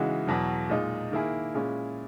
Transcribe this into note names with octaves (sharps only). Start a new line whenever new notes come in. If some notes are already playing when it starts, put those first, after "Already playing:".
Already playing: C#3 E3 G#3 D#4 F#4
E2 B2 F#3
A#2 G#3 D#4
D#3 A#3 E4 G#4
A#2 G#3 C#4 E4 G#4